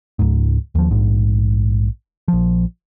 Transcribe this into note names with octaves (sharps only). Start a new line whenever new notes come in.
C#2 G#2
D#2 F3
A#1 G#2
A#1 F3